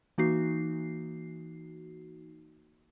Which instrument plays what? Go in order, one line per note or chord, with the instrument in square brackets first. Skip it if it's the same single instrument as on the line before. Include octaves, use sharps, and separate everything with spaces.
[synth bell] E3 A#3 D#4 F#4 C7